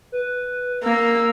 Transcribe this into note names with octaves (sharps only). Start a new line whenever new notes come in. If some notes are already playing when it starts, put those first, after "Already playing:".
B4
A#3 E6